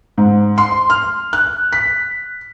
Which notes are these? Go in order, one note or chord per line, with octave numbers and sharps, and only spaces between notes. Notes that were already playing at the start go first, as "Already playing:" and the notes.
G#2
C6
F6
F#6
B6